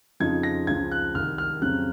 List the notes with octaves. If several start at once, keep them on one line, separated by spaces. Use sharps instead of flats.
F2 C#3 F3 C4 D#4 G#6
A#6
C#2 C#3 F3 G#6
F#6
C2 C3 D#3 F6
F6
F2 C#3 F#3 C4 F#6